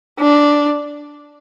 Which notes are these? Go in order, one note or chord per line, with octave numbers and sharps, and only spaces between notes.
D4